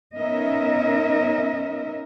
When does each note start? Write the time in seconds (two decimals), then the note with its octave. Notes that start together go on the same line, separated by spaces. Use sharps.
0.17 B3 C#4 D#4 A#4 D#5 E5